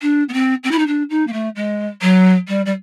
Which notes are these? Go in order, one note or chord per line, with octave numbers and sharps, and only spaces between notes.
D4
B3
C4
C4
E4
D#4
D4
D#4
A#3
A3
G#3
F#3
G3
G3